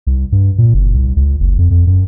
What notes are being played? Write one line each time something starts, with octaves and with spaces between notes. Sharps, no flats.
C2
G2
A#2
F#1
C2
C#2
F#1
F2
F2
F#2